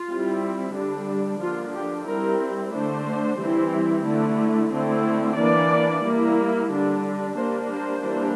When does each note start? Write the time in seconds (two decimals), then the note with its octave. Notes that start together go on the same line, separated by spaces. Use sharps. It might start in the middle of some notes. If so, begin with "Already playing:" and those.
Already playing: F4
0.08 G3 C4 E4
0.74 D3 G3 D4
1.40 D3 F3 A#3 D4 F4
1.74 G4
2.06 G3 C4 E4 A#4
2.72 D3 A3 D4 C5
3.39 E3 G3 C4 E4
4.05 D3 A3 E4
4.71 D3 A3 C4 E4
5.37 E3 A#3 D4 D5
6.03 G3 A#3 E4
6.69 D3 G3 D4
7.35 G3 A#3 D4 C5
7.68 C5
8.01 E3 G3 A#3 D4